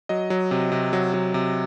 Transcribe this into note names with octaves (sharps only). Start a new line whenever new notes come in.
F#3 D#5
F#3
C3
C3
F#3
F#3
C3